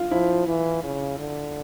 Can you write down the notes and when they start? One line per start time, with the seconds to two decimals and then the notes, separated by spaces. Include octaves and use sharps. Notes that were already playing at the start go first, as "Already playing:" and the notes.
Already playing: F4
0.11 F3 E4
0.47 E3
0.83 C#3
1.19 D3